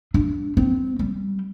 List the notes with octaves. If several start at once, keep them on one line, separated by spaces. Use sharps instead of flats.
D4
C4
G3